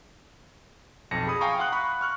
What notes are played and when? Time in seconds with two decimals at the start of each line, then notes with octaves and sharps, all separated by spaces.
1.11 B1 F2 A5 A#6 C#7
1.27 G#4 B5 D#6
1.41 F5 G5 G#5 A#5 C#6 D#6
1.59 F5 F#5 C6 D#6 F#6
1.72 B5 C#6 F#6
2.01 C#6 F6 F#6